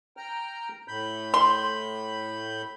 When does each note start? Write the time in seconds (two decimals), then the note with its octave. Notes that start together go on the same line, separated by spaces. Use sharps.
0.17 G5 A#5 F6
0.88 A2 B5 G6
1.34 C6